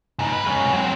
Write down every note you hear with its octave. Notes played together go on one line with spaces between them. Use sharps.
C#3 D#4
B4
F#3 G#3
F#3 C4